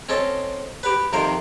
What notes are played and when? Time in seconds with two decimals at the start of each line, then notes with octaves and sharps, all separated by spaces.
0.09 C4 C#4 A4 D#5
0.83 G4 B4
1.13 F2 C3 D#3 A#4 C5